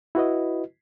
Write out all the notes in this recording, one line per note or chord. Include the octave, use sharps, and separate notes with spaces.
E4 F#4 B4 D#5